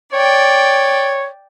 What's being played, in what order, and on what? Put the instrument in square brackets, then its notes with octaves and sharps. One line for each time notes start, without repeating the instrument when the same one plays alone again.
[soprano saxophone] C#5 [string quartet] D5 G5